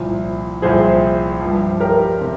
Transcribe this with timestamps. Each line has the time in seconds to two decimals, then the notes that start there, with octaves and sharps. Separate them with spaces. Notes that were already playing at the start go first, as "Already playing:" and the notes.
Already playing: C2 A#2 F3
0.62 C2 A#2 F3 G#4 C5
1.41 G2 F3
1.80 G4 A#4
2.21 C3